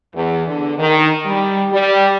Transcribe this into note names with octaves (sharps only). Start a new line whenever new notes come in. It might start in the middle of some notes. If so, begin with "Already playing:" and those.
E2
D3
D#3
G3
G3